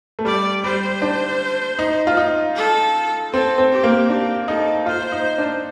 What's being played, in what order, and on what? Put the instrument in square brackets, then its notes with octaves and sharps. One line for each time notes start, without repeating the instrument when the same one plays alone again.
[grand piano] A3
[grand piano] G3 [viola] D5
[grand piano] G3 [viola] C5
[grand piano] D4
D#4
F4
D#4
[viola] A4
[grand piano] C4 [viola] A4
[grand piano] C4
[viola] G4
[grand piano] A#3
[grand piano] D4 [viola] G4
[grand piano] D#4 [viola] A4
[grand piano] F4 [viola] C5
[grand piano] D#4
D4